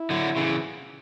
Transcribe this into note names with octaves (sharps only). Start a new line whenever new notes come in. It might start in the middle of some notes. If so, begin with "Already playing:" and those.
Already playing: E4
D3 F#3
C#3 E3